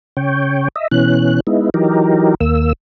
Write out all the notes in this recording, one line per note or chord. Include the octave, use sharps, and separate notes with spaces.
C#3 C#5 G5
D#5 E5
B2 E3 C#4 F#6
G#3 B3 D#4 E4
E3 F#3 D#4 G4 A#4
D#2 A#3 E6